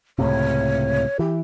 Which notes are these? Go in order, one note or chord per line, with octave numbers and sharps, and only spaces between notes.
C#2 A2 C3 C#5
E3 G4